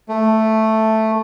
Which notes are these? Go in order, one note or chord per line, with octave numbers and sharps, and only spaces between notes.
A3